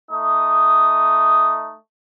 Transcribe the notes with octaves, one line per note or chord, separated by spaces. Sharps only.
A3 D#4 D#6